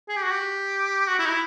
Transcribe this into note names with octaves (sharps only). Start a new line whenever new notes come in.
G#4
G4
F#4
G4
F#4
E4
D#4
E4